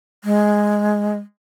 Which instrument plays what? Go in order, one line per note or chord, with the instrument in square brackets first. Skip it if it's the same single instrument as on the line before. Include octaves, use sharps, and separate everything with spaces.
[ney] G#3